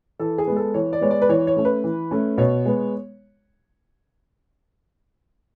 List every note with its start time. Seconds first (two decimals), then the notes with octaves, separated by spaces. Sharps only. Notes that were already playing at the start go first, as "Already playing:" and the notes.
0.20 E3 A4
0.38 G#4
0.47 G#3 B3
0.56 A4
0.74 E3 C#5
0.93 D5
1.01 G#3 B3 C#5
1.11 D5
1.22 B4
1.29 E3 C#5
1.47 C#5
1.57 A3 C#4
1.65 B4
1.84 E3
2.11 A3 C#4
2.38 B2 C#5
2.65 G#3 B3